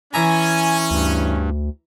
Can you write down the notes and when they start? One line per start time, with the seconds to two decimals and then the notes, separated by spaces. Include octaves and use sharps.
0.14 E3 C#4 E5 G#5 A#5
0.91 D2 G2